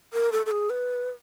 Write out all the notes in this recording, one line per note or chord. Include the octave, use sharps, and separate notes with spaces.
A#4
A4
A4
G#4
B4